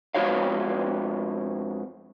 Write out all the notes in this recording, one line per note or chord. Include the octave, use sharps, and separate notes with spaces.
F2 G#3 E4 F#4 C#5 F5